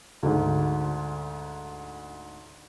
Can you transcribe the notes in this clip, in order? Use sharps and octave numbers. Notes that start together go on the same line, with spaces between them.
D2 G#2